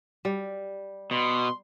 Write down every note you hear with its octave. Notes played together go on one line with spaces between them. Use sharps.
G3
B2 C6